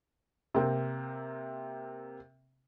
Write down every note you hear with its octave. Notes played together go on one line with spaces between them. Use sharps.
C3 A#3 C4